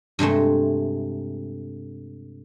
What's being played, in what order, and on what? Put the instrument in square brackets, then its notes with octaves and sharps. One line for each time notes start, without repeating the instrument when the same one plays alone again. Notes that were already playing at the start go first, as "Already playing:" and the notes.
[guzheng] G2 C3 G#3 A3